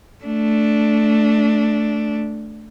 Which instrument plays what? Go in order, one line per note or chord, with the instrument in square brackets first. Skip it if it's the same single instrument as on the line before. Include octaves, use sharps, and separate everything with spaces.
[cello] A3 D4